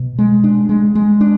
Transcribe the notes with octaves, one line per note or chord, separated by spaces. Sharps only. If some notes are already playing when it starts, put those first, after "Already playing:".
Already playing: B2
G#3
D4
G#3
G#3
D4